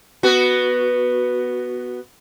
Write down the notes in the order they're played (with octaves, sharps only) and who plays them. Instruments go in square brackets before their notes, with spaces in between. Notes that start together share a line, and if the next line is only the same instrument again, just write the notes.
[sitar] B3 F#4